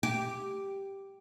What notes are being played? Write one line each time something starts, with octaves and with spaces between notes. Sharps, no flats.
G4